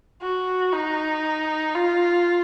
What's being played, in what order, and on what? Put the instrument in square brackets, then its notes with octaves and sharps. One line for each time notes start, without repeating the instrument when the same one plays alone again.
[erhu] F#4
D#4
F4